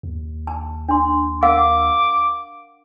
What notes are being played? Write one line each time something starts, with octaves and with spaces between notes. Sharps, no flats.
D#2
A5
D4 C6
A#4 F5 F#5 D6